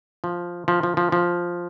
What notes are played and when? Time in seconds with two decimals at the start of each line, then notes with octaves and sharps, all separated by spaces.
0.24 F3
0.68 F3
0.83 F3
0.97 F3
1.12 F3